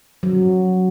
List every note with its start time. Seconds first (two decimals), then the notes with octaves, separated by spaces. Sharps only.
0.23 F#3